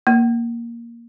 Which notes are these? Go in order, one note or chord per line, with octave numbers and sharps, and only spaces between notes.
A#3